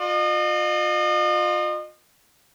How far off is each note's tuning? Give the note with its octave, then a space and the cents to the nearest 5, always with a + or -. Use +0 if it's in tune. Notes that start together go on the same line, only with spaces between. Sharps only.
F4 +25 D#5 -35